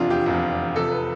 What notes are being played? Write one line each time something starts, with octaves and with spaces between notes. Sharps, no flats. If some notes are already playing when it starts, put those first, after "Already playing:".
Already playing: F1 E2 C3 F3 D4 F4
G4
F1 E2 C3 F3
F1 F2 C3 A4
B4